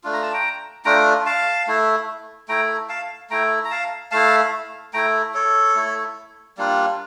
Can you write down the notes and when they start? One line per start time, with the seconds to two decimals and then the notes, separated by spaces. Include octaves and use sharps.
0.04 A3 D4 F4
0.13 A#5
0.23 A5
0.33 G5 A#5
0.85 A3 D4 F4 G5 A#5
1.26 F5 A5
1.67 A3 E4
2.49 A3 E4 G5 A#5
2.89 F5 A5
3.30 A3 E4 G5 A#5
3.65 A#5
3.70 F5 A5
4.11 A3 E4 F5 A5
4.93 A3 E4 G5 A#5
5.34 A4 C#5
5.75 A3 E4
6.58 G3 A#3 D4 F4